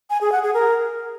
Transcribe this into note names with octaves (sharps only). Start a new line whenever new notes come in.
G#5
G#4
F#5
G#4
A#4